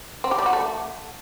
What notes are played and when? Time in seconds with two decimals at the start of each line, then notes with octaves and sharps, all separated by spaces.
0.24 C4
0.31 G4
0.39 G3
0.46 F#4
0.53 A3